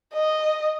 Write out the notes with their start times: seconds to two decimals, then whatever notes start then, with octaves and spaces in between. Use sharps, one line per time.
0.14 D#5